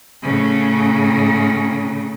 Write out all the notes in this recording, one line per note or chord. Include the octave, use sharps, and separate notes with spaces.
A2 C#3